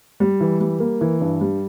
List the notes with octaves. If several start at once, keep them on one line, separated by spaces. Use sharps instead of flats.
G3
E3
G3
A#3
E3
G2
G3